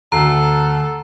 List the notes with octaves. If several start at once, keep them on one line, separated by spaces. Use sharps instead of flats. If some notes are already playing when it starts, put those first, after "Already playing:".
D2 A4 A#5 C7